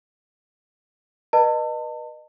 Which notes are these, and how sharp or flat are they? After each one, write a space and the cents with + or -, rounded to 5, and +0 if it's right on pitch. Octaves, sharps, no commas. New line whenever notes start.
B4 -30 D#5 -25 A5 +35